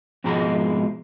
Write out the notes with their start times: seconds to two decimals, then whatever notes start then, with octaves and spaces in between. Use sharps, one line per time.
0.24 F2 G#2 B2 F3 G#3 A#5